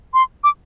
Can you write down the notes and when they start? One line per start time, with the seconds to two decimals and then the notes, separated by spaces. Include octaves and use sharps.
0.14 C6
0.44 D6